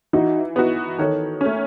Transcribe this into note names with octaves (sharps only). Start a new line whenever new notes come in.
E3 D#4 F#4
B3 D#4 F#4
D#3 A4 C#5
A3 C#4